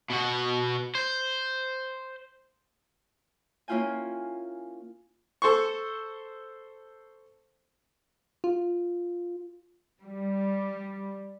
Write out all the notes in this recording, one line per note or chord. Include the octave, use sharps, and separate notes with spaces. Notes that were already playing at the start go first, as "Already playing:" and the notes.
B2 F#4
C5
A#3 C#4 E4 F4 G5 G#5
A4 C5 C6 C#6
F4
G3